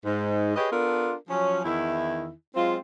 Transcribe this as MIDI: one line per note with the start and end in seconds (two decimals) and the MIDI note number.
0.04 0.55 44
0.56 0.68 67
0.56 0.68 68
0.56 0.68 71
0.56 0.68 73
0.56 0.68 75
0.71 1.13 59
0.71 1.13 62
0.71 1.13 65
0.71 1.13 69
0.71 1.13 70
1.29 1.60 53
1.29 1.60 54
1.29 1.60 61
1.64 2.30 40
1.64 2.30 51
1.64 2.30 64
2.56 2.76 54
2.56 2.76 56
2.56 2.76 60
2.56 2.76 65